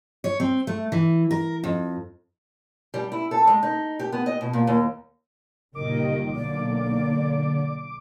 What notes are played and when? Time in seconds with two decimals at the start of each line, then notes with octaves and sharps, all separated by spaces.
0.24 C#5
0.40 C4
0.67 A3
0.92 E3
1.31 A#4
1.64 F2
2.94 G3
3.12 E4
3.31 A4
3.47 G#3
3.63 D#4
3.99 G4
4.12 B3
4.26 D#5
4.41 B2
4.53 A#2
4.67 D#2
5.75 F#1 A#2 D#3 G3 A#4 D#5 D6
6.36 B1 D3 A#3 D5